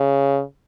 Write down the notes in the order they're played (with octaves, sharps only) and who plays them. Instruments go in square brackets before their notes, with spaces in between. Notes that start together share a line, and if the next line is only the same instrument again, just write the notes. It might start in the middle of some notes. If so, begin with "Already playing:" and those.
Already playing: [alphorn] C#3